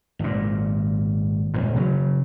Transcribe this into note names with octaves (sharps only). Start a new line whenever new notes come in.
G#1 A#2
D#1 G#1 A#2
C#3 F#3